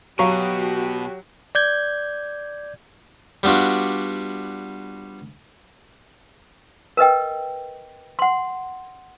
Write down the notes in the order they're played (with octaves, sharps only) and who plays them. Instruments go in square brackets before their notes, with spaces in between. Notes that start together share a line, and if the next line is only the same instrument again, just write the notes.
[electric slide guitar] B2 [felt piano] F#3 [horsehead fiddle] F#4 G4 [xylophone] F5 A#5 C#6
[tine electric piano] D5 G6 G#6
[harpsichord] G3 B3 D4 F4 F#4
[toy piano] A#4 B4 D#5 G5
F#5 C6